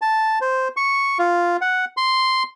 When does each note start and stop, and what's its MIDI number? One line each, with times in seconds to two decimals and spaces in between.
0.02 0.39 81
0.41 0.68 72
0.77 1.18 85
1.19 1.57 65
1.61 1.85 78
1.97 2.43 84